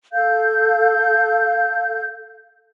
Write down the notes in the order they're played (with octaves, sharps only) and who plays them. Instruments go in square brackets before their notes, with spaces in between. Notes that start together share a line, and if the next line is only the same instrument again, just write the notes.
[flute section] A4 F5 G6